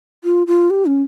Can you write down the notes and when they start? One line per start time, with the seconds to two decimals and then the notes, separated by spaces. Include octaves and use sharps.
0.24 F4
0.47 F4
0.70 G4
0.86 C#4